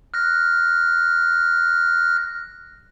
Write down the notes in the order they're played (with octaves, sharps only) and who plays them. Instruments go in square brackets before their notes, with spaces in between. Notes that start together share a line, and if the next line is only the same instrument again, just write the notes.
[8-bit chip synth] F6 F#6 A#6